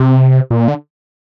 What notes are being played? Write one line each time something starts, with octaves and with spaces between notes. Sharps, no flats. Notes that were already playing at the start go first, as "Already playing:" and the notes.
Already playing: C3
A#2
D3